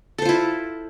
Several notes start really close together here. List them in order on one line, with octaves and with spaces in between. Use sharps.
A4 C5 F4 E4